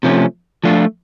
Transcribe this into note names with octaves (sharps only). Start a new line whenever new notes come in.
C3 F3 A3 C#4
F3 A3 D4 F4